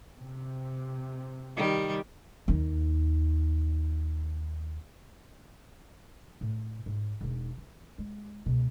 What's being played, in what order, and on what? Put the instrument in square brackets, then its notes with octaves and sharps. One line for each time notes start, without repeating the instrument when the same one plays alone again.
[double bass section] C3
[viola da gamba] D#3 G3
[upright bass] D#2 D#4
A2
G#2
E1 D#4
E3
G#3
C#2 B2